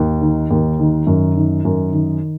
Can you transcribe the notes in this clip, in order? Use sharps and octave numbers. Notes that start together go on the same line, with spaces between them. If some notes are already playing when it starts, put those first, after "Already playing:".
Already playing: D#2
D#3
D#2
D#3
F#2
D#3
F#2
D#3